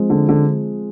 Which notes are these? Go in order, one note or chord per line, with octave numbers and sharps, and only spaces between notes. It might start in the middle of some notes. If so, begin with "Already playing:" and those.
Already playing: F3 G#3 C4
D3
D3